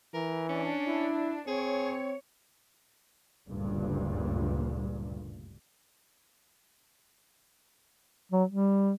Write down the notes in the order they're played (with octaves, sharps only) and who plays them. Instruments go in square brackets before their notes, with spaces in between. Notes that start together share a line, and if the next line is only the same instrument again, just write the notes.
[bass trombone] E3 [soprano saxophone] A#4
[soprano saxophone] C#4 [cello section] D4
[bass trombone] E4
[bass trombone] C4 [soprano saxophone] G#4 [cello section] C#5
[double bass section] F#1 D2 G2 A#2
[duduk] F#3
G3